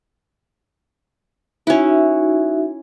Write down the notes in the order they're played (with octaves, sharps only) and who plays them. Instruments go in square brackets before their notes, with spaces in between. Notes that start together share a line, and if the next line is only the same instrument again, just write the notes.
[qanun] C#4 E4 [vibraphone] D#4 F#4 E5